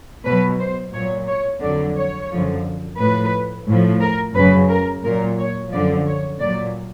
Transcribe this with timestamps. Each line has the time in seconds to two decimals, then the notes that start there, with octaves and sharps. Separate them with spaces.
0.25 B2 F#3 B4
0.60 C5
0.93 A#2 C#5
0.98 F#3
1.27 C#5
1.61 F2 D3 F#3 D5
1.96 C#5
2.30 F#2 D3 F3
2.98 A2 F3 B4
3.67 A2 F3
4.01 A#4
4.35 F#2 C#3 F#3 B4
4.69 A#4
5.04 A#2 F#3 A#4
5.38 C#5
5.71 F#2 D3 F3 D5
6.06 C#5
6.40 A#2 F#3 D5